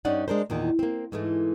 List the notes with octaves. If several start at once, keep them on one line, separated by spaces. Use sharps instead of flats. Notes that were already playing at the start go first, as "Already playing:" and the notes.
G2 C#4 D#4 D5 F#5
G#3 D4 A#4 C5
E2 A#2 D#3
A#3 C4
G#2 E3 G#3 A3